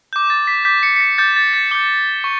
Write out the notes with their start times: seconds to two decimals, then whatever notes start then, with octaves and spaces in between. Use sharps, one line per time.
0.13 D6 G6
0.30 A6
0.47 B6
0.65 D6 G6 B6
0.83 C#7
0.96 C#7
1.01 B6
1.18 D6 G6 A6
1.36 A6
1.54 A6
1.71 D6 G6 G7
2.24 C#6